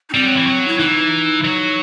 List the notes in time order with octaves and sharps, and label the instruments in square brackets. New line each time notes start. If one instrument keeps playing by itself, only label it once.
[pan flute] D#4
[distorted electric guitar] G3 [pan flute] C4
[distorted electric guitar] F#3
E3
F#3
[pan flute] E4
[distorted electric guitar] E3 [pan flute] D#4
[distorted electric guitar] F#3